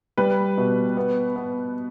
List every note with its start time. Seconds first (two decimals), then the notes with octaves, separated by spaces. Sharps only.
0.18 G3 B4
0.57 B2
0.97 B3
1.36 B3